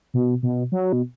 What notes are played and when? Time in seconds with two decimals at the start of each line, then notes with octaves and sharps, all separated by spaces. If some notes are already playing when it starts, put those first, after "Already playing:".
0.14 B2
0.43 B2
0.72 F#3
0.93 B2